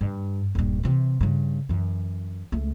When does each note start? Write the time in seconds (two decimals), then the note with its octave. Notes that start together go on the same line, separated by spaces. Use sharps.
0.01 G2
0.55 D#1 G2
0.83 C3 E3
1.21 G2 C#3
1.69 F#2 E3
2.52 C#2 A3